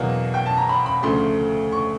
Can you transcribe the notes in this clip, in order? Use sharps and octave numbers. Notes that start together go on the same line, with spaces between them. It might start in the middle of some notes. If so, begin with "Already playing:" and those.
Already playing: E2 B2 F#3 A#3 F5 F#5
G5
A5
A#5
B5
B5
D2 C#3 F3 A3 C6
C#6